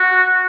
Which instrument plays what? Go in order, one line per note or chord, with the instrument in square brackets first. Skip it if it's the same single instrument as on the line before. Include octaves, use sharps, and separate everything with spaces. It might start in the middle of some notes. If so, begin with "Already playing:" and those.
Already playing: [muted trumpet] F#4